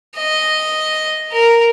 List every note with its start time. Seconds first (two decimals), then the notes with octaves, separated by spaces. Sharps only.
0.17 D#5
1.33 A#4